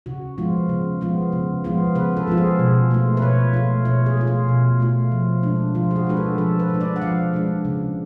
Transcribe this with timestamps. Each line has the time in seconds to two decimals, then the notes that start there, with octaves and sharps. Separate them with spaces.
0.06 C#3 F#4
0.38 F3 G#3 B3 F4
0.69 C#3
1.01 F3 G#3 B3 F4
1.32 C#3
1.64 F3 G#3 B3 F4
1.95 C#3 B4
2.17 A4
2.27 F3 G#3 B3 F4
2.38 G#4
2.59 B2
2.91 A3 F4
3.17 B4
3.22 B2 C#5
3.53 A3 F4
3.85 B2 C#5
4.06 G#4
4.17 A3 F4
4.27 F4
4.49 B2
4.80 A3 F4
5.12 F3
5.43 G#3 D4
5.75 F3 F4
5.91 G#4
5.96 F#4
6.07 G#3 D4 B4
6.17 A4
6.38 F3 A4
6.59 B4
6.70 G#3 D4
6.81 D5
6.96 F#5
7.02 F3 F5
7.34 G#3 D4
7.65 C#3